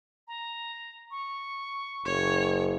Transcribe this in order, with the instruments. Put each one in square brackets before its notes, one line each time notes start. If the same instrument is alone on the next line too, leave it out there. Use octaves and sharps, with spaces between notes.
[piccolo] A#5
C#6
[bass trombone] F#1 [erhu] C#5